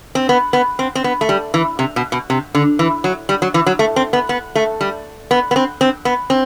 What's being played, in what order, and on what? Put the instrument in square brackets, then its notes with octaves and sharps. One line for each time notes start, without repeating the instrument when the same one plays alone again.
[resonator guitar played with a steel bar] C4
B3
B3
C4
C4
B3
A3
G3
E3
C3
B2
B2
C3
D3
E3
F#3
G3
F#3
E3
F#3
A3
C4
B3
B3
A3
G3
B3
B3
C4
C4
B3
C4